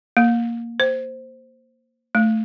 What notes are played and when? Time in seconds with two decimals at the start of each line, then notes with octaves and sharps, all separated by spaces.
0.17 A#3
0.80 C5
2.15 A3